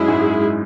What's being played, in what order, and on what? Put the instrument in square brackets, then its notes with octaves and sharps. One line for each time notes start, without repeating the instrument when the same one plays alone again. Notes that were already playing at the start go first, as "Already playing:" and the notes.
Already playing: [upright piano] F#2 [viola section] G#3 E4 G#4
[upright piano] G#2